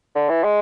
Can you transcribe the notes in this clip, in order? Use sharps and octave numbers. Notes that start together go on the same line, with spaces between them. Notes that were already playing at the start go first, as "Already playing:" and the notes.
D3
E3
G#3